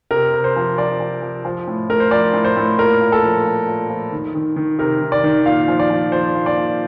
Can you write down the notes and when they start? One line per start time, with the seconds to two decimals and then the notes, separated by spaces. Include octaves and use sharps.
0.11 C3 A#4
0.34 C3
0.44 C5
0.56 F3
0.78 F3 D5
1.00 F3
1.22 F3
1.45 F3
1.67 A2
1.90 A2 A#4
2.00 C5
2.11 F3 D5
2.34 A2
2.44 C5
2.57 A2
2.78 A#2 A#4
3.01 A#2
3.12 A4
3.23 F3
3.45 F3
3.67 A#2
3.89 F3
4.12 D#3
4.35 D#3
4.56 D#3
4.79 C3 A#4
5.01 D#3
5.12 D5
5.24 D#3
5.46 A#2 F5
5.68 F3
5.79 D5
5.90 F3
6.12 F3 C5
6.35 A#2
6.46 D5
6.57 A#2